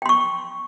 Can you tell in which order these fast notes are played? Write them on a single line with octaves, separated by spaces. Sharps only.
G5 C6 C#6